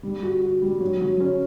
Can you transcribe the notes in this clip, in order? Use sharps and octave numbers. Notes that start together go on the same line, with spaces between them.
G3
F#4
F#4
G3
F#3
F#3
C#4